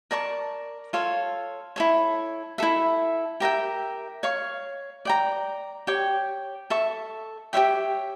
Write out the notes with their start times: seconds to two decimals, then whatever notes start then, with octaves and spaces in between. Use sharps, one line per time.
0.11 A#4 D5 A5 C#6
0.93 F4 A4 C#5 F5
1.76 E4 A4 C#5
2.58 E4 A4 E5
3.40 G4 A#4 E5 G5
4.23 C#5 F5 C#6
5.05 D5 G5 A#5
5.87 G4 C#5 G5
6.70 A4 E5 A5 C#6
7.53 G4 C#5 E5 G5